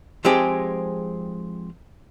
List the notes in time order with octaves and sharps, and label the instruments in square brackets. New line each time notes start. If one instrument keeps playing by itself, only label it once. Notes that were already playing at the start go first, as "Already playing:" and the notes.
[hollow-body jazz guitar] F3 G#3 C4 D#4 G4 G#4